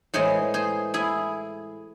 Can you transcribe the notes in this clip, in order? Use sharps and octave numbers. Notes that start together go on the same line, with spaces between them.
A2 E3 G#3 G#4 C5
G#4 C5
E4 G#4